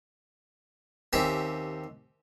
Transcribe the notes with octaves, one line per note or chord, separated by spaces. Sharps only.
D#2 C4 C#4 G4 E5